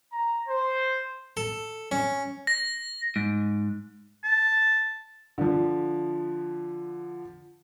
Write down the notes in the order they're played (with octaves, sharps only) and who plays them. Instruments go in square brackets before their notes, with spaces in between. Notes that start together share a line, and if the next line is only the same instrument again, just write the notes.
[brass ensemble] A#5
C5
[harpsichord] A4
C#4
[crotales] A#6
[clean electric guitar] G#2
[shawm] A5
[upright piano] D3 F3